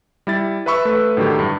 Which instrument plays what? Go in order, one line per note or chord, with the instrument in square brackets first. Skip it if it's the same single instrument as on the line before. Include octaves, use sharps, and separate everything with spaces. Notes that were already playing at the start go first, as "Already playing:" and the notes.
[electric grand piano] G3 E4 A6
B4 E5 B5 C#6 E6
A3 B4
A2 D3 D#3 F#3 G4
G2